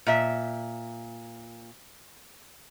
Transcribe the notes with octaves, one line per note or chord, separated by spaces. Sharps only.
A#2 E5